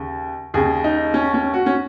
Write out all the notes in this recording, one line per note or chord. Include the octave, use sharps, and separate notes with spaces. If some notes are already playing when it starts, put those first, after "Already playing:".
Already playing: D#2 C#3
D#2 C#3 G#4
D#4
C#4
C#4
F#4
C#4